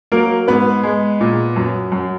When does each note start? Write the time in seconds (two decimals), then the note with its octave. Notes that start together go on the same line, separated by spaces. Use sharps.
0.12 F#3 A#3 A#4
0.48 G#2 B3 B4
0.84 G#3
1.21 A#2
1.56 F#2
1.92 F#2